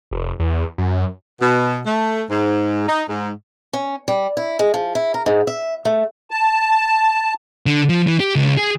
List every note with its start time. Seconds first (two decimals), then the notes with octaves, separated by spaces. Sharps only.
0.11 F1
0.40 E2
0.78 F#2
1.41 B2
1.86 A3
2.30 G#2
2.88 D#4
3.08 G#2
3.73 C#4
4.08 G3
4.37 E4
4.59 G#3
4.74 F3
4.95 E4
5.14 A#4
5.26 G#2
5.47 E5
5.85 A3
6.31 A5
7.66 D3
7.89 F3
8.07 E3
8.20 G4
8.35 C#2
8.57 G#4